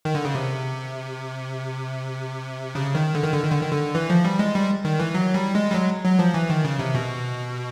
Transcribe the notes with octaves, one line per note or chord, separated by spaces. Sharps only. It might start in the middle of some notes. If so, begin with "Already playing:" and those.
D#3
D3
C#3
C3
C#3
D#3
D3
D#3
D3
D#3
D3
D#3
D3
E3
F3
G3
G#3
G3
D#3
E3
F#3
G3
G#3
G3
F#3
F#3
F3
E3
D#3
C#3
C3
B2